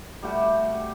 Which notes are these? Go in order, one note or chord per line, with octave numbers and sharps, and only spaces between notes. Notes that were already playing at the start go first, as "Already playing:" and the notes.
G3 A3 F#4 G4